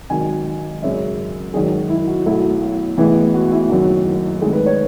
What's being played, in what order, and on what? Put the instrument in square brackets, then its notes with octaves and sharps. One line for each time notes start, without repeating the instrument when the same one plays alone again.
[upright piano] G#1 G#2 D#3 F#3 G#5
G#1 F#2 C#3 E5
G#1 F#2 D#3 F#3 G#4
F#4
E4
F#4
B1 B2 F#3 A3 E4
A1 A2 E3 G#3 B3
F#4
E4
F#1 F#2 D#3 F#4
G#1 G#2 D#3 A3 G#4
B4
C#5